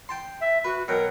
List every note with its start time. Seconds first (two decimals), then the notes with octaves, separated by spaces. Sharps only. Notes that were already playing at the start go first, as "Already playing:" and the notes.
0.09 G5 A5 C6
0.41 E5
0.64 F#4 B4
0.88 B2 F#3 A#4 G5